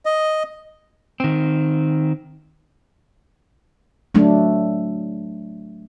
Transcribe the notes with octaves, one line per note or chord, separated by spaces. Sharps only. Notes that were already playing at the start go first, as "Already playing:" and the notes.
D#5
D#3 C4
F#3 A3 D4